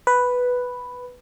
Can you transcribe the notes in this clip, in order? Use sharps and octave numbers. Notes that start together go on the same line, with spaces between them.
B4